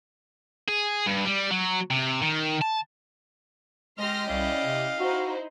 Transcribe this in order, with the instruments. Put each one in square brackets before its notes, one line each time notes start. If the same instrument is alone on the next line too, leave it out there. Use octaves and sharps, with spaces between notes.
[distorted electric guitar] G#4
G2
G3
F#3
C3
D#3
A5
[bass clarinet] G#3 [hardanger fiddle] G4 D#5 [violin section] C6 F6 A#6
[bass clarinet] C2 [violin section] C#4 E4 D5 [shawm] F5
[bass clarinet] C3
[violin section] D#4 E4 C5 [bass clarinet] F#4